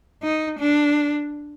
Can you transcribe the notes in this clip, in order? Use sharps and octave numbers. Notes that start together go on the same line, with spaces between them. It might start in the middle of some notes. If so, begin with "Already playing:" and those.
D#4
D4